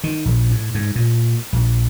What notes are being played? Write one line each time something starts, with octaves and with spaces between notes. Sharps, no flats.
D#3
A#1
A2
G#2
A#2
A#1